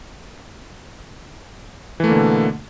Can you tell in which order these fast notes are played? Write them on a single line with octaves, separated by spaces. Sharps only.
E3 A3 A#3 D3 B2